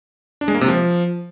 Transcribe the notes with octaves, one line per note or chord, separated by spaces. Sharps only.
D4
G#3
A#3
C3
F3